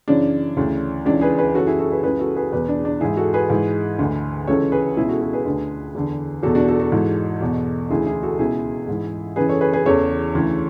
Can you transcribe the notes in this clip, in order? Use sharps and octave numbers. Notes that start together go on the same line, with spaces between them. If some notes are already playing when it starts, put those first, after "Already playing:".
F#2 C#3 E3 D4
D2 C#3 E3
C#2 C#3 E3 D4
G#4 B4
G#4 B4
F#2 C#3 E3 F#4 A4
E4 G#4
F#4 A4
G#4 B4
C#2 C#3 E3 G#4 B4
F#4 A4
G#4 B4
E2 B2 G#4 B4
D4
D4
G#2 E3 E4 G#4
F#4 A4
G#4 B4
G#2 E3
D2 D3
C#2 C#3 E3 A4 C#5
G#4 B4
C#2 B2 E4 G#4
F#4 A4
F#4 A4
G#4 B4
D2 D3
E2 D3
E2 B2 F#4 A4
D4 F#4
F#4 A4
F#4 A4
G#2 E3
E2 B2
D2 C#3 E3 E4 G#4
E4 G#4
F#4 A4
C#2 B2 E4 G#4
G#2 E3
F#2 C#3 E3 G#4 B4
A4 C#5
G#4 B4
G#4 B4
E2 C#3 E3 A4 C#5
D2 C#3 E3